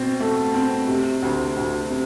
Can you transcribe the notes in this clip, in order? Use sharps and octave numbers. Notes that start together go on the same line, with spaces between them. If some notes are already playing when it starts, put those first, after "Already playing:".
Already playing: B2 C4
A3
C4
C3
D2
D2
C3